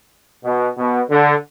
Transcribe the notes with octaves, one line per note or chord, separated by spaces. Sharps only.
B2
B2
D3